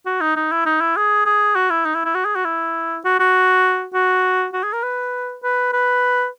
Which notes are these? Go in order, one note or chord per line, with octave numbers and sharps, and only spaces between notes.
F#4
D#4
D#4
E4
D#4
E4
G#4
G#4
F#4
E4
D#4
E4
E4
F#4
G#4
F#4
E4
F#4
F#4
F#4
F#4
G#4
A#4
B4
B4
B4